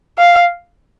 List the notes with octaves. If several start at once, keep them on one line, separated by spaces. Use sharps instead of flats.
F5